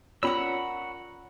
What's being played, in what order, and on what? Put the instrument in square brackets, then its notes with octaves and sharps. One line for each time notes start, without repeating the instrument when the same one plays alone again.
[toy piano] C#4 F4 D5 [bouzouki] A#4 C#5 [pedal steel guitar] F#5 B5 E6